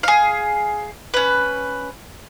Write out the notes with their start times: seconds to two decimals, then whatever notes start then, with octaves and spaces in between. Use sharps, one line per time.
0.03 G#4 F5
1.14 C#4 B4